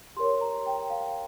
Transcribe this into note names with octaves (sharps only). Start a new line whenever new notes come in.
G4 A#4 C#5 C6
A#5
G5
F5